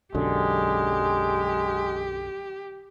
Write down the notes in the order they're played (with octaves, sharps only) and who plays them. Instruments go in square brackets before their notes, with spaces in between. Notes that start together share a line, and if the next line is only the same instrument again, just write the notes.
[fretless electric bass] B1 F#2 D3 [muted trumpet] G#3 [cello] G4